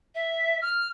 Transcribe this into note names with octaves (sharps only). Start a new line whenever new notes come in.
E5
F6